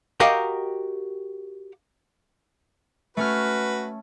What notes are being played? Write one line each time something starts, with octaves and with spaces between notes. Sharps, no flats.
F#4 G4 A#4 D#5 F5 G5
A3 C#4 F#4 B4 F6